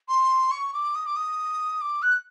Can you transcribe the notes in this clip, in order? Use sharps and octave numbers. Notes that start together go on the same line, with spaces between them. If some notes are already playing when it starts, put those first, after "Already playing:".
C6
C#6
D6
D#6
D6
D#6
D6
F#6